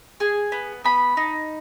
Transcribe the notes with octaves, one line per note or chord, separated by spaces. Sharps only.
G#4
B3
B3 B5
D#4